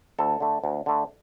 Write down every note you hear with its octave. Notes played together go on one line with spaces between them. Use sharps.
D2 A4
D3 A3
D2
D3 A3